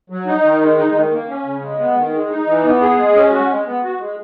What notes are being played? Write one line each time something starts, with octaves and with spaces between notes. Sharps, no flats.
F#3
D#4
D#3
G#3
D#4
D#3
A#3
C#4
C#3
G#3
B3
D#3
G#3
D#4
E3
B3
G#4
G#3
C#4
F#4
G#3
B3
F#4
G#3